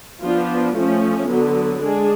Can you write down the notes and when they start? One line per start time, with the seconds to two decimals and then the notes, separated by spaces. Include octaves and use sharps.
0.23 F3 B3 D4 F4
0.75 F3 A3 C#4
1.29 D3 F#3 B3
1.82 G#3 D4 G#4